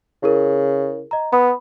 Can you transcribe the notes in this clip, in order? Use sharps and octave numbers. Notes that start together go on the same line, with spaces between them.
C#3 E4 G#4 A#4
D#5 A#5
B3 B5 D#6